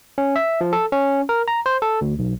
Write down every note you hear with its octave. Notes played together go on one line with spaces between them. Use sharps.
C#4
E5
F3
A4
C#4
A#4
A#5
C5
A4
D2
B1